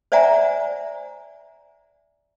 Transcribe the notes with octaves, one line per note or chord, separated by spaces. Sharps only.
C5 D5 E5 F#5 G#5 A#5